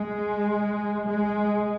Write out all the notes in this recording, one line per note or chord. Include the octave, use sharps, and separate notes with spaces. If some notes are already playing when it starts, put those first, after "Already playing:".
Already playing: G#3
G#3